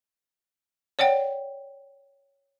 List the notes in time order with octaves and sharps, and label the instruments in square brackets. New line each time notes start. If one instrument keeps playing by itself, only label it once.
[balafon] C#5 D5 F#5 G5